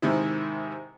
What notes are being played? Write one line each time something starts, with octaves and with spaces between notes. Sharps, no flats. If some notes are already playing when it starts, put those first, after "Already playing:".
G#2 C3 D#3 E4